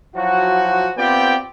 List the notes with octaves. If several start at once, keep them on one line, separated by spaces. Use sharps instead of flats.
F3 F#3 E4 F#4
B3 C4 F4 G4 D5 G5